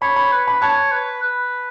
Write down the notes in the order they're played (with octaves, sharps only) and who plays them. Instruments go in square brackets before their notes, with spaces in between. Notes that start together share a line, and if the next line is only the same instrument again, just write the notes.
[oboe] C#5 [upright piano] B5
[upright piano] B5
[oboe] B4
[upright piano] B5
[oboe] C#5 [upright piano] A5
[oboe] B4
B4